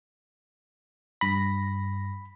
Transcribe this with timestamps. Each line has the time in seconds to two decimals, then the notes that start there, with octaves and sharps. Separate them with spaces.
1.21 G2 B5 A#6